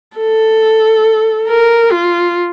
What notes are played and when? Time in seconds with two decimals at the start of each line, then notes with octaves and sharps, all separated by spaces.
0.17 A4
1.48 A#4
1.92 F4